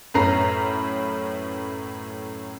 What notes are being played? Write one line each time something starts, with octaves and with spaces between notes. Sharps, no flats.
F#2 A2 C#4 B4 A#5 C7